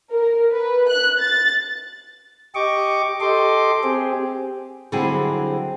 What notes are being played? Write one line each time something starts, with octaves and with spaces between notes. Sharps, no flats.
A#4
B4
F#6
A6
G4 D#5 C#6 D6
G4 A4 D#5 C6 D6
C4 G4 G#4
D3 F#3 G3 C4 E4 G#4